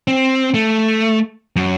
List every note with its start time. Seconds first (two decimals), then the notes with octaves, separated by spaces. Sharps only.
0.08 C4
0.54 A3
1.56 F#2